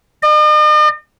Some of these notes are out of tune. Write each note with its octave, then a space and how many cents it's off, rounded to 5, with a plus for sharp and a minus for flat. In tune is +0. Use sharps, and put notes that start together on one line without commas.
D#5 -45